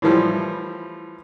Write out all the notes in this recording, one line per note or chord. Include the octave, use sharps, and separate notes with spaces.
A2 E3 F3 G3